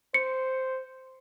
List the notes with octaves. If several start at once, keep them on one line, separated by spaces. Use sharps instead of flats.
C5 C#7